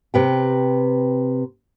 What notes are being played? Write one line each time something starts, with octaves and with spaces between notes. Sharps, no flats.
C3 B4 G5